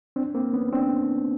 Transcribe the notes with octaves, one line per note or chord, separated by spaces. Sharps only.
C4 D4
A#3 C4
B3 C#4
C4 D4